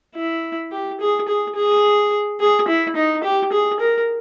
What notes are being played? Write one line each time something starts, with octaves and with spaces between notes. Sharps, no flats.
E4
G4
G#4
G#4
G#4
G#4
E4
D#4
G4
G#4
A#4